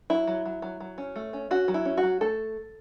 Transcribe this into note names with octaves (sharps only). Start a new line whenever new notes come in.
F#3 E4
F#3
F#3
F#3
F#3
C#4
A3
C#4
C#4 F#4
F#3
E4
C#4
F#4
F#3
A3 A4